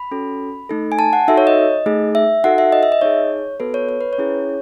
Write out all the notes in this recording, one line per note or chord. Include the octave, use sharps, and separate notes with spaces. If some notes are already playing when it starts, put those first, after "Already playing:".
Already playing: B5
C#4 F#4 A4
A3 D#4 A4
G#5
A5
F#5
D#4 F#4 A4 E5
C#5
D#5
A3 D#4 G#4
E5
D#4 F#4 A4 F#5
E5
D#5
E5
D#5
D#4 G#4 C#5
B3 F#4 A4 B4
C#5
C#5
B4
C#5
C#4 E4 G#4